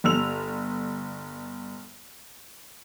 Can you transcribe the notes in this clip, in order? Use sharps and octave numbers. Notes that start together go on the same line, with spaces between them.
G1 E6 F7